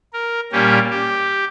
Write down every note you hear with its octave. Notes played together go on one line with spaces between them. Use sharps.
A#4
A#2 G3 A#3 C#4 G4
G4